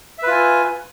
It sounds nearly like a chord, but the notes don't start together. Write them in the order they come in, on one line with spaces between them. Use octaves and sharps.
E5 B4 F4 G#5